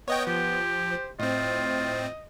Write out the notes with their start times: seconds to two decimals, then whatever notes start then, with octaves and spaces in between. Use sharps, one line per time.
0.08 B3 C#5 D#5 G5
0.27 F3 G4
0.91 C5
1.19 A2 C4 F4 D#5